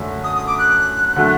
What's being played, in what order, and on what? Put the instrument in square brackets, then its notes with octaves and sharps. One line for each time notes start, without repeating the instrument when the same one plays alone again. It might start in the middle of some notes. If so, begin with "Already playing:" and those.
Already playing: [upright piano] F#2 D3 A3
[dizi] D#6
D#6
D6
F#6
[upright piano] D3 F#3 A3